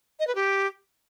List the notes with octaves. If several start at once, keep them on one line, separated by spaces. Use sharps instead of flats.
D#5
B4
G4